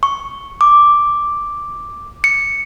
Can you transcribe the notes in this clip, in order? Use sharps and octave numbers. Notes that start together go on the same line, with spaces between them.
C#6
D6
C#7